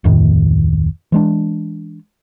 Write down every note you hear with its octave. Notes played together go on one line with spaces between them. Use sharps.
D1 F2 A2 D#3
E3 G#3 D4